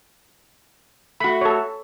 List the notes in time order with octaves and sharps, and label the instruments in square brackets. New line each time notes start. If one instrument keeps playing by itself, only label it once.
[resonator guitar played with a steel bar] A3 F#4 [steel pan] B5
[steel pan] A4 C#5